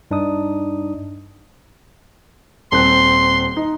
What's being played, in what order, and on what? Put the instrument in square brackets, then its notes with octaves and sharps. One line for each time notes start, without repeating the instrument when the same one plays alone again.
[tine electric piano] G2 D4 D#4 D#6
[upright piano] D#1 C4 F#6 [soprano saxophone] C6
[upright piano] D#4